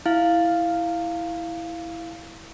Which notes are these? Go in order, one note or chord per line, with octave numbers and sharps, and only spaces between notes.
E4 F5